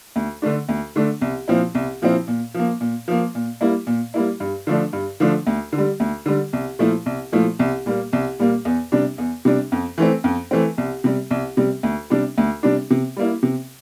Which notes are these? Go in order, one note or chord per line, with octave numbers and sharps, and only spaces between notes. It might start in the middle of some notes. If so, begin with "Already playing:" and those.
D2
D3 A3 D4
D2
D3 A3 D4
C2
A#2 F3 C4 E4
C2
A#2 F3 C4 E4
A#2
F3 A#3
A#2
F3 A#3
A#2
G3 A#3 E4
A#2
G3 A#3 E4
G2
D3 F3 A3 D4
G2
D3 F3 A3 D4
D2
D3
G3
D2
D3 G3
C2
A#2 F3 A3 E4
C2
A#2 F3 A3 E4
C2
A#2 G3 A#3
C2
A#2 G3 A#3
E2
C3 G3 D4
E2
C3 G3 D4
F2
E3 A3 C4
F2
E3 A3 C4
C2
C3 G3
C2
C3 G3
D2
C3 G3 D4
D2
C3 G3 D4
C3
G3 A#3 E4
C3